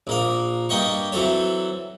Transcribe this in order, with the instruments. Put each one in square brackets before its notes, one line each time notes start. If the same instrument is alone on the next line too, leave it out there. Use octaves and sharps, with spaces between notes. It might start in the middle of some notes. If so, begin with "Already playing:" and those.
[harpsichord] A#1 A#3 F5
G2 A#3 D#5 G5 C#6
E3 F#3 C4 A4 C#5